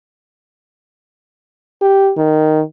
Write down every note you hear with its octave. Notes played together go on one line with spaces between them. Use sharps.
G4
D#3